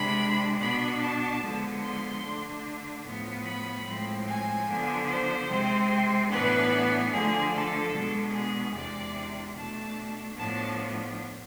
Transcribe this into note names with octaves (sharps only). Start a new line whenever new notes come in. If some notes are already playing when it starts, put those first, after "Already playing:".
Already playing: C3 G#3 D4 B5
B2 B3 D4 B5
A5
D3 F3 G#3 B3
C6
D3 A3 D4
A2 F3 B3
B5
A2 F3 G#3 C4
G#5
D3 F3 B3 D4
C5
C3 G#3 C4
A2 E3 B3 D4 B4
D3 F3 A3 G#4
A4
B2 G#3 B3 D4
G#4
E2 C3 G#3 D4 D5
B2 A3 D4 A5
A2 F3 B3 D4 A5